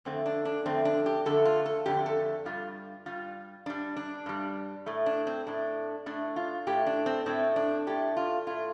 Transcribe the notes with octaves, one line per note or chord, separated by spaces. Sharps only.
F2 D3 A3 C4
D4
D4
F2 D3 A3 C4
D4
G4
F2 D3 A3 A4
F4
A4
F2 D3 A3 G4
A4
G2 G3 F4
G2 G3 F4
G2 G3 D4
D4
G2 G3
A2 A3
D4
C4
A2 A3 D4
A2 A3 D4
F4
A2 A3 G4
D4
C4
A2 A3 C4
D4
A2 A3 G4
F4
A2 A3 F4